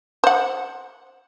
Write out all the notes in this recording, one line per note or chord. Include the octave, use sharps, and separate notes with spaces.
C5 F#5